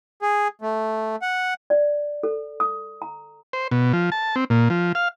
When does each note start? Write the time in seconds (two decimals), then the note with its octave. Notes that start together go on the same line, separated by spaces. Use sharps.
0.22 G#4
0.62 A3
1.22 F#5
1.70 D5
2.23 A4
2.60 D#6
3.02 A#5
3.53 C5
3.71 B2
3.93 F3
4.12 A5
4.36 C4
4.50 A#2
4.70 F3
4.95 F5